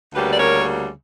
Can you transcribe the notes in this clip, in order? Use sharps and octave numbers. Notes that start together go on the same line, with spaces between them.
D2 C#3 G3 A#3 G4 B4
D5
A#4 C#5